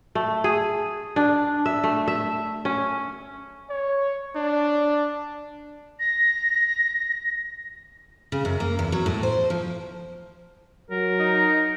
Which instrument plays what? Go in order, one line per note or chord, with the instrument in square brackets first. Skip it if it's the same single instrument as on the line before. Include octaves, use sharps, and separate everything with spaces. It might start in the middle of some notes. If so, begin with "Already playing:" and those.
[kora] A3
G#4
D4
E5
A3
E5
C#4
[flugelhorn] C#5
D4
[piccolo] A#6
[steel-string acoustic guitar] C#3
F#2
A#3
E2
F#3
A2
C5
F3
[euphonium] F#3 [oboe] A#4
[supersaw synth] D#4